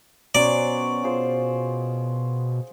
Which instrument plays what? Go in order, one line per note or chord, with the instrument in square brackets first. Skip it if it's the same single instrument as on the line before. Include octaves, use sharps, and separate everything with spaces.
[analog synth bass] B2 [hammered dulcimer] F#3 C#4 C5 [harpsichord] D5
[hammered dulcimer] F4 G#4 C5